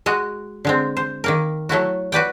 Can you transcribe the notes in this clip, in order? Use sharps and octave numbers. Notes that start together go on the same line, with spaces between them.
G#3 F#4 D#5
D3 G#3 C4
C5
D#3 A#3 A#4
F#3 A3 E4 F#4
F#4 B4 D5 G5